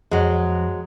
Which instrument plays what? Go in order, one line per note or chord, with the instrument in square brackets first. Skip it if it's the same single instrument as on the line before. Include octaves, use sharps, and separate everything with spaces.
[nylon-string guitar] F2 [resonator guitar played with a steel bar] F#3 G#3